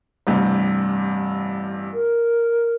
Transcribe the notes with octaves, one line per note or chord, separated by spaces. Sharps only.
A1 G2 C3
A#4